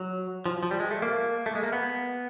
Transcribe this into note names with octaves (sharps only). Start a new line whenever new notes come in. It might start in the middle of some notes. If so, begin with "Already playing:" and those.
Already playing: F#3
F3
F3
G3
G#3
A3
A#3
A3
G#3
A#3
B3